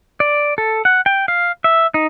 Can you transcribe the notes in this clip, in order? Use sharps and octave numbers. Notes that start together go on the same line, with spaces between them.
D5
A4
F#5
G5
F5
E5
D#4